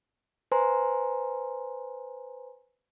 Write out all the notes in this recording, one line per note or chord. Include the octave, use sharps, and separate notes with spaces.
B4 C5 G#5 A#5 C6